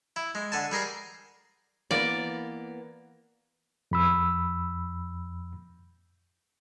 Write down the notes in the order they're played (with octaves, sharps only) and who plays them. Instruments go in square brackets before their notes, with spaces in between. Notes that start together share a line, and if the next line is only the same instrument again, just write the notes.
[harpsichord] E4
G#3
D3 G#5 A5
G3 G#4 A#4 C6
[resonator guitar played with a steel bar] E3 A#3 B3 [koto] D5
[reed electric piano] F2 B5 E6